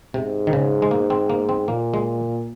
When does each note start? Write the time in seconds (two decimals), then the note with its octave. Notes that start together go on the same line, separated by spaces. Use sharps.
0.14 G#2 C3
0.47 D#3
0.53 C#3
0.82 G#3
0.91 A#3
1.10 C4
1.29 A#3
1.49 C4
1.68 A#2 A#3
1.94 G#3